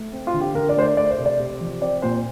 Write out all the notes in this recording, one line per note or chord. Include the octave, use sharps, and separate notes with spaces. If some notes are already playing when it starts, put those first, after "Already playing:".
Already playing: A3
C4
F4
D3
G4
D3 A#4
D5
A3 C5
D5
A3 D5
C5
C3
D5
C3
F3
C4 D5
A#2 C5